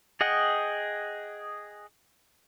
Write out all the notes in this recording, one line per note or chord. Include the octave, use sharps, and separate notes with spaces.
G#4 D#5 F#5 G5